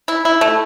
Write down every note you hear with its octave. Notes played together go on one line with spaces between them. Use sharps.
E4
E4
A3